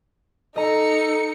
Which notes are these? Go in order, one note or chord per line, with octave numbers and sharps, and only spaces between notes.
D#4 A4 D#5 A#5 C#7